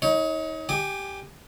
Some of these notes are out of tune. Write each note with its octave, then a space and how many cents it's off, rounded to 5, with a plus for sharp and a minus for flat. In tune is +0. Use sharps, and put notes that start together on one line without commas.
D#4 +30 C#5 +0
G4 +0 G#5 +0 D6 +30